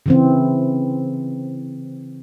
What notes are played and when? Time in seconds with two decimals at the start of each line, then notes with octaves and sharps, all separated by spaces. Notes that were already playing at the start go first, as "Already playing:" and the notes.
0.06 C#3 E3 C4